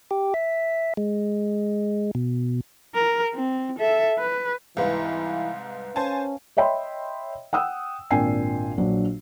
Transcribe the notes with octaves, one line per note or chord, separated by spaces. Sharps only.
G4
E5
G#3
B2
A#4
C4
A4 E5
B4
C2 G#2 E3 B4 F5
C#4 C5 G#5 A5
C#5 D#5 E5 G5 B5 C6
F#5 G5 D#6 E6
G#1 A#2 D4 G5 G#5 C7
A#1 F#3 D4